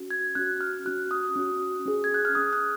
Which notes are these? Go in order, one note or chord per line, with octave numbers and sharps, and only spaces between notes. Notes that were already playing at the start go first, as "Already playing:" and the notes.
Already playing: C#4 F#4
G#6
C#4 F#4 F#6
F6
C#4 F#4 F#6
D#6
C#4 F#4
C#4 G#4
G#6
F#6
F6
C#4 G#4 D#6
F#6